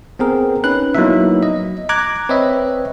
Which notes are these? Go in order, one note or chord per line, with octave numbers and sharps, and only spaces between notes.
B3 C4 G#4 A#4
C#4 D#4 B4 F#6
F#3 A#3 B3 D#4 E4 E5
D#5
A#5 D6 F#6 G#6
C4 B4 C#5 D#5 E5